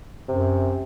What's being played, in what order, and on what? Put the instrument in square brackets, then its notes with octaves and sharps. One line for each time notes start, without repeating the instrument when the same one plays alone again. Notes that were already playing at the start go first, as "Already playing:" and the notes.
[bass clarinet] F#2 [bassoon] C3